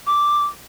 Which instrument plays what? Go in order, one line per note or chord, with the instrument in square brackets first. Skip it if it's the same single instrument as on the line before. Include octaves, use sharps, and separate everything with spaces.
[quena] D6